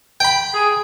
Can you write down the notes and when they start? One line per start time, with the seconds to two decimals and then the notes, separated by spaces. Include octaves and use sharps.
0.20 G5 B5
0.54 G#4